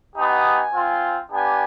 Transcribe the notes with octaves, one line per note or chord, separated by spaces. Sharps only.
B3 D#4 G4 G#5
C4 F4
B3 D4 G4 G#5